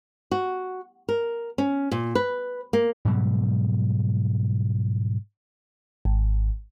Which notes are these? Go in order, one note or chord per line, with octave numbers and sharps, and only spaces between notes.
F#4
A#4
C#4
A#2
B4
A#3
G#2 B2 F#3 G3
G#1